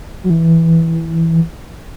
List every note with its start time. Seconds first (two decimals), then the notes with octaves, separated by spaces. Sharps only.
0.24 F#3
0.30 E3